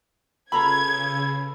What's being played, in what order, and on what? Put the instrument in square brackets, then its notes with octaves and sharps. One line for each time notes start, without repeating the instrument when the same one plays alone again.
[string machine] C#3 [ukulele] F4 A#5 B5 [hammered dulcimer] A4 B4 [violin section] G#6